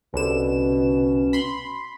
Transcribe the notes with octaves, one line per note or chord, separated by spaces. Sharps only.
C2 B2 D3 C#4 E7
B5 C6